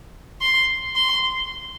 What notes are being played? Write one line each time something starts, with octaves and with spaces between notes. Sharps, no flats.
C6
C6